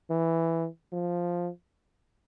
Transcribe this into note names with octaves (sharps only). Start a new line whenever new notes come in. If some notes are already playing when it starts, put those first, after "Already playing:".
E3
F3